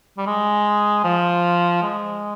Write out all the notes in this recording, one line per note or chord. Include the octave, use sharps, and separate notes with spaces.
G3
G#3
F3
G#3